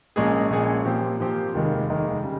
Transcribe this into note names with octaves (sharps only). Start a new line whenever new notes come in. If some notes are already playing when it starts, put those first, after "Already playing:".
A#1 A#2 G#3 C#4 G#4
A#1 A#2 G#3 C#4 G#4
A#2 F3 C4 G4
A#2 F3 C4 G4
F1 D#2 D#3 G#3
F1 D#2 D#3 G#3
C#3 G3